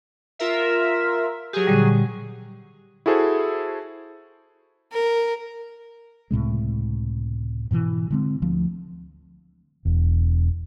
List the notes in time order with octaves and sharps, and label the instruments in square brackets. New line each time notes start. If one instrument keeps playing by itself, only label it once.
[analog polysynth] F4 A#4 E5
[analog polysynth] F#3 G#4 [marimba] G4
[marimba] A#2 D3 G3
[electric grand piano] E4 F#4 G#4 A4 C5
[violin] A#4
[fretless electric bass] C#2 A2 C3 G#3
G#2 B2 D#3 E3
D3 G#3 C4
D2 F3
[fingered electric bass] E1